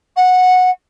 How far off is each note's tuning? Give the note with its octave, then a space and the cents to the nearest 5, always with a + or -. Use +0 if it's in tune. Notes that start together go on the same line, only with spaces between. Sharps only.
F#5 -15